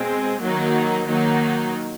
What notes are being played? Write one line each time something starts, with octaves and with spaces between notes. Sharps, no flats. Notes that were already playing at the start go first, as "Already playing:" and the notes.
Already playing: B2 G#3 C4
D#3 F#3 A#3 D#4
D#3 F#3 A#3 D#4